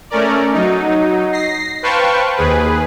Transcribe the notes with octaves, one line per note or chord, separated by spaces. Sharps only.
A3 C#4 A#4 D5
F#3 D#4
A#6 C7
B4 C5 F5 G5 A5 C#6
D#2 G#4 B4